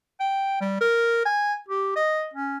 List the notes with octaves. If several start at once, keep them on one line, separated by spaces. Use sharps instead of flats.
G5
G3
A#4
G#5
G4
D#5
C#4